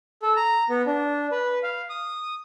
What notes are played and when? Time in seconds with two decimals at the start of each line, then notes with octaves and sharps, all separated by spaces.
0.22 A4
0.36 A#5
0.69 B3
0.86 D4
1.31 B4
1.63 F5
1.90 D#6